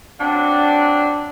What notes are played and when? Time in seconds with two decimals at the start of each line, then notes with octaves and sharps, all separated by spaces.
0.20 F#3 C4 D4